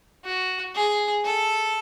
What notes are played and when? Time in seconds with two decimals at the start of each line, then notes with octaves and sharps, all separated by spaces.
0.25 F#4
0.75 G#4
1.25 A4